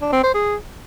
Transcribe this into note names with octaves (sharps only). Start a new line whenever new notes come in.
D4
C4
C5
G#4